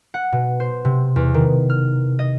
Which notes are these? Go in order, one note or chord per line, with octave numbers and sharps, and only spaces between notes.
F#5
B2
C5
C3
E2
D#3
F6
D#5